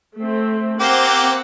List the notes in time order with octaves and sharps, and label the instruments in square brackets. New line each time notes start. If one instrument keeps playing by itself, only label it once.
[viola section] A3 C4
[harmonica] A#3 G4 C5 [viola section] C4 F#5